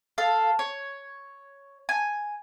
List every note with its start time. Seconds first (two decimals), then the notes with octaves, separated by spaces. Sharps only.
0.18 A4 F5
0.59 C#5
1.89 G#5